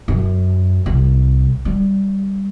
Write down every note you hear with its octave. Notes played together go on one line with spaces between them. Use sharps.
F#2
C2
G3